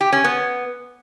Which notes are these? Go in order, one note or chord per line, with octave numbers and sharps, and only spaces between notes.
G4
C#4
B3